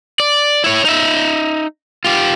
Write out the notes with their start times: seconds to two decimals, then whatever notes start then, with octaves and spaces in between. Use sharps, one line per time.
0.20 D5
0.64 E4 C#5
0.85 D#4 E5
2.05 F4 G4